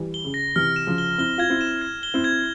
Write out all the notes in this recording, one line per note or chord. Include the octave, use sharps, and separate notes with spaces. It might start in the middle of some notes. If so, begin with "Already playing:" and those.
Already playing: E3 G3
G7
C#3
A#6
C3 E3 F6
E7
C#3 F3
G7
C4 E4 G7
F4 G#6
C4 E4
E7
G#6
G7
C4 E4
G#6